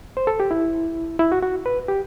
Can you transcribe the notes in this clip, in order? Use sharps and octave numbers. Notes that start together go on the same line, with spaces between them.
C5
A4
G4
E4
E4
F#4
F#4
B4
G4